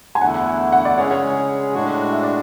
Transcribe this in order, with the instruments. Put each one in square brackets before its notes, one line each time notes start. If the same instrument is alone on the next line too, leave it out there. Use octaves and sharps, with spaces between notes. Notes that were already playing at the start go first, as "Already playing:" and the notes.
[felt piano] G#5
[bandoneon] E2 D3 A3 E4 [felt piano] F#5
[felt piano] F#5
D5
[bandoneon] C#3 G#3 C#4 G#4 [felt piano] C#5
[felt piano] C#5
[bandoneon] A2 G#3 D4 F#4
[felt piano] E5
D5